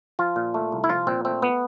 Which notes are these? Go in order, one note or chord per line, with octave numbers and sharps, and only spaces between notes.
F3 F4
A#2
A3
C2
E4
F3 F4
A#2 C4
A3 C4
B3